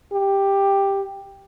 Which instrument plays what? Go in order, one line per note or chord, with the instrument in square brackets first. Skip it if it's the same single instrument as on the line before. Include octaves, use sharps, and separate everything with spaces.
[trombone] G4